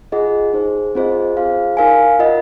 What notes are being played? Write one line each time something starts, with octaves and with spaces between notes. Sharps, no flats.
F4 G#4 D#5 F#5
D#4 G#4 C5
C4 F4 G#4 C5 D#5
F4 G#4 C5 F5
D#4 A#4 F5 G#5
F4 A#4 D#5 F#5